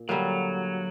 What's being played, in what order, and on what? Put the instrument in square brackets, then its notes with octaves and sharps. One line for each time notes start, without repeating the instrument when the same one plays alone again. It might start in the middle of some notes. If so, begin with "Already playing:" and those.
Already playing: [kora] A#2
[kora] D3 G3 A#3 [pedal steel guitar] F#3